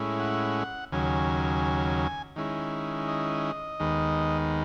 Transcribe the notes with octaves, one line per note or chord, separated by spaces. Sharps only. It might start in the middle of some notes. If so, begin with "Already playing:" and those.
Already playing: A2 G#3 C#4 E4
F#5
D#2 C#3 F#3 G#5
D#3 G#3 C#4 E4
D#5
D#2 D#3 G#3 B3